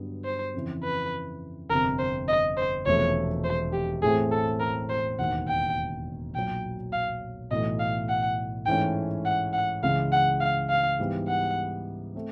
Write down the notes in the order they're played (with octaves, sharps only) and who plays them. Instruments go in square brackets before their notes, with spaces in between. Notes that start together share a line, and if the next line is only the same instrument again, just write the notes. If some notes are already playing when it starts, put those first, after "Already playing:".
Already playing: [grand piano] G2 D3 F#3 B3
[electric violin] C5
[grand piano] F2 C#3 E3
[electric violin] B4
[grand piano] G1 F2 C3 [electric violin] A#4
[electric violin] C5
D#5
C5
[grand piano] E1 E2 C3 F3 A3 [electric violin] C#5
[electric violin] C5
G4
[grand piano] A2 E3 A3 C4 [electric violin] G#4
[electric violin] A4
A#4
C5
[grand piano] E1 D#2 D#3 [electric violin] F#5
[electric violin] G5
[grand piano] B1 A#2 F#3 [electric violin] G5
[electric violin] F5
[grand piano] B1 A2 E3 A3 [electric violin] D#5
[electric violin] F5
F#5
[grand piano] G#2 E3 A3 C#4 [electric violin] G5
[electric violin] F#5
F#5
[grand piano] C#2 C#3 E3 G#3 [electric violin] F5
[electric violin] F#5
F5
F5
[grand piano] G#2 E3 G3 B3
[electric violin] F#5
[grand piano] A3 C4